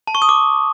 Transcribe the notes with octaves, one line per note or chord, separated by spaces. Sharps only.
A5
C#6
D#6
D6